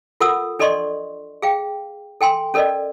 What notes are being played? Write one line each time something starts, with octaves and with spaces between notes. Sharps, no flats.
F4 A4 A#4 F#5 D#6 E6
D4 A4 D5 D#5 C6 C#6
G#4 F5 G5
A4 G5 G#5 C6
C#4 A4 A#4 D5 D#5